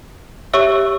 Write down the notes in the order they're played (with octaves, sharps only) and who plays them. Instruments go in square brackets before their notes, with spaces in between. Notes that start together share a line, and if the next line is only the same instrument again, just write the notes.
[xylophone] G4 C#5 E5 C#6 E6